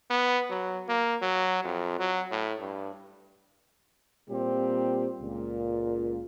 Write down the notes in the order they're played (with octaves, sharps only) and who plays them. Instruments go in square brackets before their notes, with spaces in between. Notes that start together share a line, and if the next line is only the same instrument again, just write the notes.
[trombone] B3
F#3
A#3
F#3
F2
F#3
A2
G2
[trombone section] A#2 G3 C4 G4
C#2 A#2